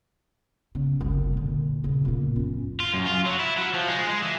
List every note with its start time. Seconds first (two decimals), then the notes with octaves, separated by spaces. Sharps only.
0.75 C#3
1.00 F#1 C2
1.33 A#2 D3
1.84 D#1 C#3
2.05 A#2 A#3
2.36 F#2 C#4
2.80 F4
2.94 F#2
3.07 F4
3.26 F#3
3.39 E4
3.57 F#3
3.74 F3
3.88 G#3
4.09 G#3
4.22 E3